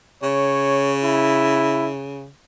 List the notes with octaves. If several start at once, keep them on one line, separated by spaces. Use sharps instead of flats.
C#3 C#5
E4